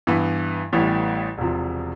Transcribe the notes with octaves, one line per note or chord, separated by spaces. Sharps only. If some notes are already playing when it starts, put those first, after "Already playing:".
G2 E3 B3
A1 A2 E3 G3 B3
E1 E2 C3 F3